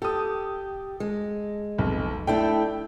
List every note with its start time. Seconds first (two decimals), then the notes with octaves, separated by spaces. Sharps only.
0.02 G4 A4 D#6
1.00 G#3
1.78 F1 B1
2.27 A3 D4 E4 G5